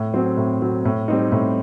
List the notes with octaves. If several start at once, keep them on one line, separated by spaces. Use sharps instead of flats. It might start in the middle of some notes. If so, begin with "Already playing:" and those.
Already playing: A2
F#3 C4
A2
F#3 C4
A2
G3 C4 D#4
A2